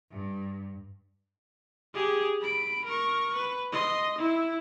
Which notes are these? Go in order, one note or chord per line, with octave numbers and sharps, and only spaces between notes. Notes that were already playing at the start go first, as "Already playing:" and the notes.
G2
G4 G#4
B5 D7
A#4 C#6
B4
D#5 C6
E4